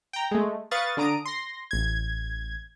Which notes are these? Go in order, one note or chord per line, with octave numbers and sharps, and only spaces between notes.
G5 A#5
G#3 A3
B4 F5 C#6 D#6 A6
D3 D4 A#5 D#6 D7
C6 A#6
A1 G#6